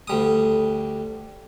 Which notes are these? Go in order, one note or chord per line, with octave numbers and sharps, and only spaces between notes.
D2 G3 D#6